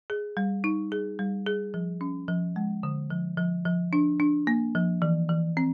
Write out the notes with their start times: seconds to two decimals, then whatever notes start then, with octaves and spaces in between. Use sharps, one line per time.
0.10 G#4
0.37 G3
0.64 D#4
0.92 G#4
1.19 G3
1.46 G#4
1.74 F3
2.01 C#4
2.28 F3
2.56 G#3
2.83 D3
3.10 F3
3.38 F3
3.65 F3
3.93 D4
4.20 D4
4.47 A#3
4.75 F3
5.02 E3
5.29 E3
5.57 C4